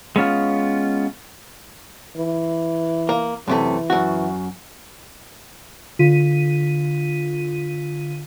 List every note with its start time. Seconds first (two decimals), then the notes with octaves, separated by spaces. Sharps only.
0.16 G#3 B3 C#4 F4
2.17 E3
3.09 A#3
3.48 F#2 C3 E3 A3
3.90 F#2 F#4
5.99 D3 F4 B6 D#7